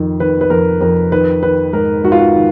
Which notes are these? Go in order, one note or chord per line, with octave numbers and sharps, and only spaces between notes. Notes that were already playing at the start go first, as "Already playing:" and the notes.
Already playing: F2 D#3
D#3 B4
B4
F2 A#4
F2 A#4
D#3 B4
D#3 B4
G#2 A#4
G#2 F#4
F4
F#4
D#3